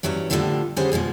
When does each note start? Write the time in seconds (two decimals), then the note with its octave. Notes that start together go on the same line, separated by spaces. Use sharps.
0.03 G2 E3 F#3 C#4 C#5 D5
0.30 A2 D3 F3 G3 F4 A4
0.76 D3 G3 G#3 C#4 G#4 C5
0.92 G2 B2 F3 G#3